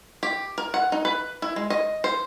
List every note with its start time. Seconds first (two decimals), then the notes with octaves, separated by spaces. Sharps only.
0.23 G4
0.58 A#4
0.74 F#5
0.92 D#4
1.05 B4
1.42 E4
1.56 G#3
1.70 D#5
2.04 C5